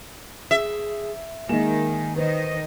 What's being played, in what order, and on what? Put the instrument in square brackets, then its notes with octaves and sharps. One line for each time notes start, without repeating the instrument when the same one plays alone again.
[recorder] G#4 [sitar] E5
[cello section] D#3 [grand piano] G#3 A#3 E7 [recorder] G#5
[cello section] D#3 D#5 [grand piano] B4 [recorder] C5